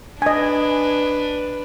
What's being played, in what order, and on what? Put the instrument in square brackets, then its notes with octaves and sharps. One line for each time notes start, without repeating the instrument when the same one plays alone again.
[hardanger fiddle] D4 B4 [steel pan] D#5 G#5